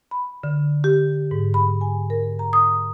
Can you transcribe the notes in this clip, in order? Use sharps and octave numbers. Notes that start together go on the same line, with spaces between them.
B5
D3
G4
G#2
B5
G#5
A#4
A#5
D#6